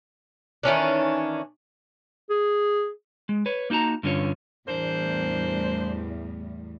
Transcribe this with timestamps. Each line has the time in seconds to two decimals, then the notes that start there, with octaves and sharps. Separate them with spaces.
0.63 D#3 E3 C#4 D4
2.30 G#4
3.29 G#3
3.46 B4 C#5
3.70 A#3 D#4 F#4 A5 A#5
4.03 G2 D3 C#4 F4 C#5
4.68 E2 A2 G3 D4 A#4 C5